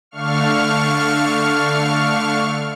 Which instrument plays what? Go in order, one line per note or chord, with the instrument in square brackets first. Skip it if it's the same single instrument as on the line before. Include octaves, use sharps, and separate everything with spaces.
[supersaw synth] D3 A3 D4 F5 C#6 F6